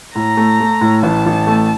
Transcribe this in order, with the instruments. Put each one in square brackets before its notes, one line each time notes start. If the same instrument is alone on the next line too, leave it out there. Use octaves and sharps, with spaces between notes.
[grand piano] A2 [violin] A#5
[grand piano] A3
A3
A2
[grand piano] A1 [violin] A5
[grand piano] A1
A3